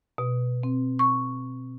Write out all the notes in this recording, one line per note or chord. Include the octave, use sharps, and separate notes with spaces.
B2
C4
C#6